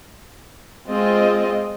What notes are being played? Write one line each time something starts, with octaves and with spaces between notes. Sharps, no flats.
G#3 C4 F4 D#5